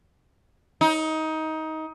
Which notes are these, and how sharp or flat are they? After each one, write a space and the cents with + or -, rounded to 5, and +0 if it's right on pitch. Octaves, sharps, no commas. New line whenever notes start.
D#4 +20